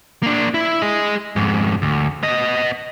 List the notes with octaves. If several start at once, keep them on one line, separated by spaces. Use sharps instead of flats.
A#3 D4
E4
G#4 D#5
F2 G#2
D2
B3 D#5